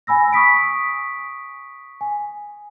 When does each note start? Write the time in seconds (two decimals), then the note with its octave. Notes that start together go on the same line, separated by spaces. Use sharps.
0.07 G#5 B5 E6 A#6
0.32 C#6 D#6 B6 D7
2.01 G#5